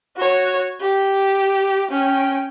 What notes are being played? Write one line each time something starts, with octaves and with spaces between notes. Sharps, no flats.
F#4 C#5
G4
C#4 G5